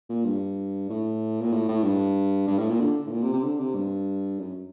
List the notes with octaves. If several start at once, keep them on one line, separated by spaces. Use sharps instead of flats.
A#2
G2
A2
A#2
A2
A2
G2
G2
A2
A#2
D3
A2
A#2
C3
C3
D3
C3
G2
F#2